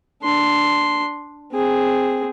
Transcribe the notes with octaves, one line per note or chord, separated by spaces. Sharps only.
D4 C6
C4 G#4